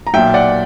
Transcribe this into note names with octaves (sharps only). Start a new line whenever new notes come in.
A#5
B1 A#2 E5 G5
D5 F#5